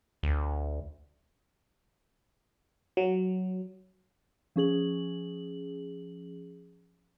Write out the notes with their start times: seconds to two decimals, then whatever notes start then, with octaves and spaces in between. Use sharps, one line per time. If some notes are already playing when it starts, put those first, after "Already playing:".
0.23 D2
2.97 F#3
4.56 F3 C#4 G#4 F#7